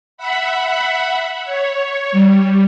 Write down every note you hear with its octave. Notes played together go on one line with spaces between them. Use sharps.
E5 F#5 B5
C#5
G3